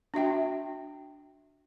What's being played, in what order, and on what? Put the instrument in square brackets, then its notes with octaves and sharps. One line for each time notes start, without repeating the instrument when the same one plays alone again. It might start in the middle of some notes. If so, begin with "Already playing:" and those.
[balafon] D4 F#4 E5 G5